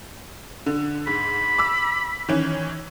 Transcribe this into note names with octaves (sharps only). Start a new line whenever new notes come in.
D3
G#2 B5
D6 E6
D#3 E3 C#4